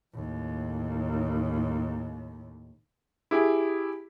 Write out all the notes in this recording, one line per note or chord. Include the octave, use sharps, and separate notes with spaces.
D#2 A2
E4 G4 G#4